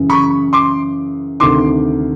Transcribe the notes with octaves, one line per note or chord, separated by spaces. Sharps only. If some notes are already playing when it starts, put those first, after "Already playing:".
Already playing: F#2 C#3 E3
B5 C#6
C6 D6
D2 C3 D#3 C6 D6